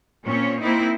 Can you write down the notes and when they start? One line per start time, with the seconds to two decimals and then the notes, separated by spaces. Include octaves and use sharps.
0.25 A#2 C4 C#4 C#5
0.61 A#3 C4 D#4 E4